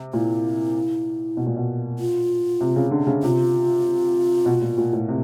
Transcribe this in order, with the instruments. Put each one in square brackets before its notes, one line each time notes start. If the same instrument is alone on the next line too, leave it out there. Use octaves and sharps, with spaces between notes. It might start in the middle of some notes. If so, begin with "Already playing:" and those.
Already playing: [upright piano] C3
[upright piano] A#2 [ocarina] E4
[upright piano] B2
A#2
B2
[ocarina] F4
[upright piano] C3
C#3
D3
C#3
[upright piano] C3 [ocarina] F4
[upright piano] B2
A#2
A#2
A2
C3